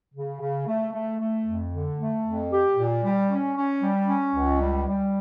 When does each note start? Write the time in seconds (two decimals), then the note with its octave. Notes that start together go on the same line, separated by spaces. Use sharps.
0.14 C#3
0.40 C#3
0.67 A3
0.92 A3
1.20 A3
1.46 F2
1.72 D3
1.99 A3
2.24 F2
2.51 G4
2.76 A#2
3.03 G3
3.30 C#4
3.56 C#4
3.81 G3
4.08 C#4
4.35 C#2
4.60 G3
4.87 G3